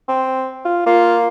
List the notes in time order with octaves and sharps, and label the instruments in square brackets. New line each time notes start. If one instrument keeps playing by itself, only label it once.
[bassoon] C4
F4
[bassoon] A#3 [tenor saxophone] F4